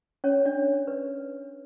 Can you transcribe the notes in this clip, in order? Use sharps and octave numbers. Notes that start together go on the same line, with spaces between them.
C#4 C#5
D4 D5
B4